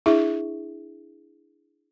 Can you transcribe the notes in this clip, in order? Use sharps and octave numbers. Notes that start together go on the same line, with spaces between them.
D4 E4 G#4 E5 C#6